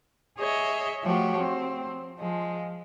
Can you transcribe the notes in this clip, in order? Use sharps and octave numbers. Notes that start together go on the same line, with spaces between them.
G#4 C#5 D#5 E5
F3 A3 F#4 G4 C#5
C4
F3 G#3